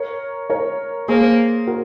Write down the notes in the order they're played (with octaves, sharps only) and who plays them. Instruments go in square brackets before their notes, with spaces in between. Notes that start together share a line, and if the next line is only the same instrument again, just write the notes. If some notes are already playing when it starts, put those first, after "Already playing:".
Already playing: [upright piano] A#4 C#5
A#4 C#5
[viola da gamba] A#3 [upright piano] G#4 C5
[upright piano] F#4 A#4